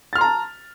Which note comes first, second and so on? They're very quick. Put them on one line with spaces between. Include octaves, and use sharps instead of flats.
A6 F6 C6 A#5 A5